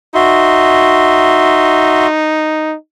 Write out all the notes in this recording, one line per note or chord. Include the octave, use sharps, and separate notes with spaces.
D#4 F#4 E5 C6